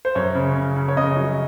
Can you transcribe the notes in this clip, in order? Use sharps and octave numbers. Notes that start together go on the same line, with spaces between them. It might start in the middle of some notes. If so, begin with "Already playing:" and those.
C5
F#2 C#5
C#3
C#3
C#3
C#5
C#3 D#5
F#3